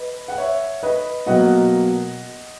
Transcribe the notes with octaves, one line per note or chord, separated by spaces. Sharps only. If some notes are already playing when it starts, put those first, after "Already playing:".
Already playing: B4 D#5
F#5
C#5 E5
B4 D#5
B2 F#3 A#3 D#5 F#5